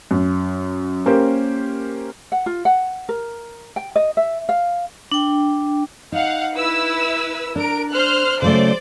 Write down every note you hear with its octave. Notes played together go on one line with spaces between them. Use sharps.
F#2
A#3 C#4 G4 A#4 C5
F#5
F4
F#5
A#4
G5
D#5
E5
F5
D4 G5
D#4 F5 F#5
E4 B4 E6
D4 A#4 D7
C5 F6 F#6
C#3 F#3 A3 C5 D5